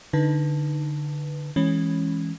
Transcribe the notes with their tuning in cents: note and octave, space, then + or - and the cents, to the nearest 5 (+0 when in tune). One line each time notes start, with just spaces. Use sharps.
D3 +0 D#4 +0 B4 -5
E3 +0 G#3 +0 C#4 -15